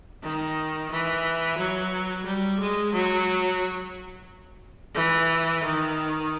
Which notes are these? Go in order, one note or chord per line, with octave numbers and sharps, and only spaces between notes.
D#3
E3
F#3
G3
G#3
F#3
E3
D#3